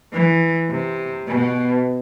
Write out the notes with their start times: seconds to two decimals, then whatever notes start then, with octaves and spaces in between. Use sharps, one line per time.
0.13 E3
0.70 C3
1.28 B2